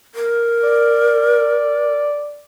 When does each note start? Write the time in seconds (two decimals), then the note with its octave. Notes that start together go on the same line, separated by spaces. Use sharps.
0.15 A#4
0.64 D5